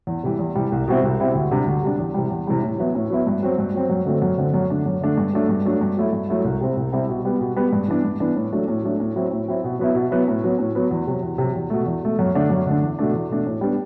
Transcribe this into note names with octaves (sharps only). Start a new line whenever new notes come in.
E2
C3 E3 G3
E2
C3 E3 G3
C2
B2 G3 C4 E4
C2
B2 G3 C4 E4
D2
C3 G3 D4
D2
C3 G3 D4
E2
C3 E3 G3
E2
C3 E3 G3
A2
F#3 B3 E4
A2
F#3 B3 E4
G2
F#3 C4
G2
F#3 C4
F#2
D3 F#3 A3 C4
F#2
D3 F#3 A3 C4
F#2
D3 A3 D4
F#2
D3 A3 D4
G2
F#3 A3 D4
G2
F#3 A3 D4
G2
F#3 A3 E4
G2
F#3 A3 E4
C2
C3 G3 C4 E4
C2
C3 G3 C4 E4
B2
G3 B3
B2
G3 B3
G2
E3 B3 D4
G2
E3 B3 D4
A2
F#3 A3 D4
A2
F#3 A3 D4
A2
F#3 C4 E4
A2
F#3 C4 E4
B2
F#3 B3 E4
B2
F#3 B3 E4
A2
F#3 B3
A2
F#3 B3
E2
C3 F#3
E2
C3 F#3
E2
B2 A3
E2
B2 A3
F#2
D3 A3 D4
F#2
D3 A3 D4
E2
B2 A3 D4
E2
B2 A3 D4
A2
G3 B3 D4